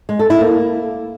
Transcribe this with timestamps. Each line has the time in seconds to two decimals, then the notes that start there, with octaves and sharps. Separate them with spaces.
0.09 G#3
0.19 A4
0.30 E4
0.41 A#3